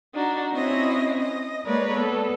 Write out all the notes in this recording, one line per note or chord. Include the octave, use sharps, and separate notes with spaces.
D4 D#4 F#4
C4 C#4 E4 F#4 C#5 D#5
D#5
G#3 A#3 A#4 B4 C#5 D5
B3 A4